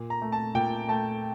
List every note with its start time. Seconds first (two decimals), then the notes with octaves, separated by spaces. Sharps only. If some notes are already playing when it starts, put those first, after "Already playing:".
Already playing: A#2
0.10 A#5
0.22 A3
0.32 A5
0.55 A#2 G5
0.88 A3 A5